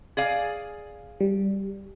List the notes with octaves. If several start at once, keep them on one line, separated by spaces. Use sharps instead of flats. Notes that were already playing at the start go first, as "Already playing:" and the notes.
G#4 D5 F5
G3